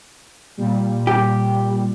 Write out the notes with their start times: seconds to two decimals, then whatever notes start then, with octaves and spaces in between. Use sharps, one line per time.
0.57 A#2 G3
1.07 G4